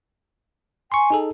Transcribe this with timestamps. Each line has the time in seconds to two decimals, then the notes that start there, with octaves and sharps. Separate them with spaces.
0.92 G#5 C6 C#6
1.11 D#4 G#4 A4